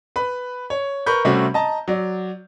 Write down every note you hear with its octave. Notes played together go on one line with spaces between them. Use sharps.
B4 B5
C#5
A#4 B4 B5 C#6 G6
C3 G3 A3 C4 C#4 F#4
D#5 A5 A#5
F#3 D5